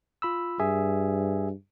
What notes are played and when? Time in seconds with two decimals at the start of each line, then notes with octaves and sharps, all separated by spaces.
0.22 F4 B5 E6
0.59 G2 G#4 E5 G#5